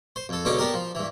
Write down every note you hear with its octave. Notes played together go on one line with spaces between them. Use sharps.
C5
F2 A4
C#2 B2 D3 C#4 D#4 D6
B3 D4 G4 A#4
F3
G2 E3